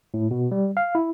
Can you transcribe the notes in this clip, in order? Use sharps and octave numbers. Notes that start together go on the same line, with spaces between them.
A2
B2
G3
F5
E4